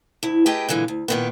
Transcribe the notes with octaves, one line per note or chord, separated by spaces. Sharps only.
D2 E4
A3 G4 G#4 B4 D#5 G5
A#2 D3 E3 G#3
D2
A#2 D#3 B3